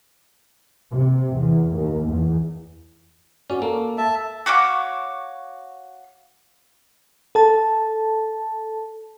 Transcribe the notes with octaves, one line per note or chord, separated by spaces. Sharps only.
C3
E2
D#2
E2
C#4 F#4 D5
A#3 A4
E5 A5
F#4 C#5 F5 D6
A4 A5